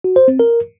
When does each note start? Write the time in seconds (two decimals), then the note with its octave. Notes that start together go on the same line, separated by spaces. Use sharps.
0.04 F#4
0.16 C5
0.28 C4
0.39 A#4